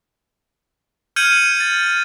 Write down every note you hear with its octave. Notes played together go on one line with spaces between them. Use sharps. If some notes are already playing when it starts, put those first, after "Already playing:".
F6 G6 G#6 C#7 D#7 F#7
A6